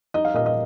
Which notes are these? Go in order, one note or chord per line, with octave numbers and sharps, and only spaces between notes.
D#4 D#5
F5
A#2 D#5
D#5